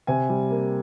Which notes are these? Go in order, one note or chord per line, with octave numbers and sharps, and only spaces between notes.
C3 G#5
G3
A#3